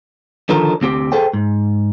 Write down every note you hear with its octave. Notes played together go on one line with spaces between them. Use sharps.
D3 D#3 F3 A4 A#4
D2 C4 G4
G#4 A4 C5 G5
G#2